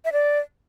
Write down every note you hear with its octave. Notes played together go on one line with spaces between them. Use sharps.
E5
D5